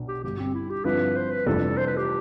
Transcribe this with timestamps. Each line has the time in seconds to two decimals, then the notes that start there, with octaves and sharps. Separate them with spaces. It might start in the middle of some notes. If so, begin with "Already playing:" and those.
Already playing: B1 B2 D4
0.08 G4
0.24 G1 G2 D3 G4
0.39 C4
0.54 E4
0.70 G4
0.85 G2 D3 F3 C4 E4 B4
1.16 C5
1.31 B4
1.46 F1 F2 E3 G3 D4 A4
1.77 C5
1.87 B4
1.97 G4